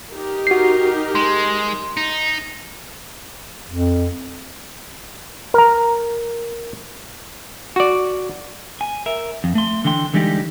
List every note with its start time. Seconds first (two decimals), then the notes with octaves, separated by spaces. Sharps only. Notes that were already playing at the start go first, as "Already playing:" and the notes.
0.14 D#4 G4 A#4
0.47 F#4 C7
1.15 G#3 C6
1.97 D#4
3.70 F2
5.54 A#4 A#5
7.76 F#4 D5
8.81 G#5
9.06 A#4 E5
9.44 F2
9.55 A3 C6
9.84 D3 E3 D4 G5 C6
10.14 D3 E3 G3 G#3 D#4 G4